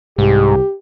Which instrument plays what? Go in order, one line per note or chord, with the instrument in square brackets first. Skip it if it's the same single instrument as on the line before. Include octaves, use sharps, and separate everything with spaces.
[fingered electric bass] C2 [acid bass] G#2 [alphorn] G4